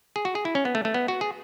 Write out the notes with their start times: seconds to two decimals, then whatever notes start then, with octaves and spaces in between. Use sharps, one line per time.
0.16 G#4
0.25 F#4
0.35 G#4
0.45 E4
0.55 C#4
0.65 B3
0.75 A3
0.85 A3
0.94 B3
1.08 F#4
1.21 G#4